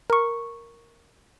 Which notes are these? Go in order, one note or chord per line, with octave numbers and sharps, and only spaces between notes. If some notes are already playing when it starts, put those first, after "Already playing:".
A#4 C#6